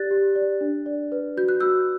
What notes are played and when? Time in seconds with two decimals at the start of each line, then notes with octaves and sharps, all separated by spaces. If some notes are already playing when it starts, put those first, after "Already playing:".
Already playing: G4 D5 F#6 A6
0.11 G4
0.36 D5
0.61 D4
0.86 D5
1.12 B4
1.37 F#4 G6
1.49 F#6
1.60 F#4 E6 G6